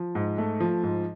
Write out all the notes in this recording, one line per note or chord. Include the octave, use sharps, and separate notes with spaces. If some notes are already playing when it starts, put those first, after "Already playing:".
Already playing: F3
G#2
A3
F3
G#2